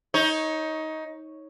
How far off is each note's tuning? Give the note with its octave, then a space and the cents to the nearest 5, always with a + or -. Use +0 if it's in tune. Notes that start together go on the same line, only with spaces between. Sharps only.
D#4 +20 C#5 -5